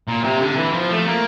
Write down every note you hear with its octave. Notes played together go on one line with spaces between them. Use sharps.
A#2
C3
D3
E3
F3
A3
A#3